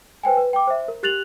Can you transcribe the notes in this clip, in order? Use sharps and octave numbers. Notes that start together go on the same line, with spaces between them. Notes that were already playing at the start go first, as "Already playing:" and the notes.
B4 C5 G5 G#5
B4
G5 D6
C5 E5
A#4
G4 F#6 A6 F7 F#7